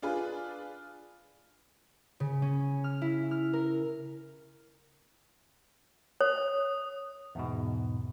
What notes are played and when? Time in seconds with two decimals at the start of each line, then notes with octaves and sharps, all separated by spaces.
0.02 D4 F4 G#4 B4
2.20 C#3
2.42 C#4
2.84 F6
3.02 E4
3.31 F6
3.53 A#4
6.21 C#5 D#6
7.35 E2 G#2 B2